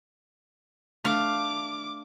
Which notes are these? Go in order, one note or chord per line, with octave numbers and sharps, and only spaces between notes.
A3 D4 F5 D6 F6